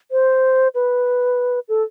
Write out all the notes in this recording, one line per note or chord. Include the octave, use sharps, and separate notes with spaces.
C5
B4
A4